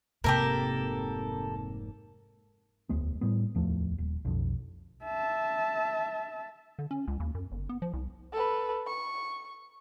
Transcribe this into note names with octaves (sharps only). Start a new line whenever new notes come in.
F1 G#2 C3 A#3 G4 A4 A#4
E1 D2 G#3 B3
A2 G3 B3
D1 E2 F3 A3
D#1
B1 F2
E5 A5
D3
C#4
C#2
D#2
F#2
G1
B3
F3
C2
A4 B4
C#6